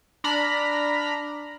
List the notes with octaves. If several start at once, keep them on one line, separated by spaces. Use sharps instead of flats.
D4 A#5 B5 F6